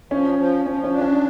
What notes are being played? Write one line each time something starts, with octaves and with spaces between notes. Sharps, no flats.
F3 C#4
F3
F3 C#4
C#4
D4
C#4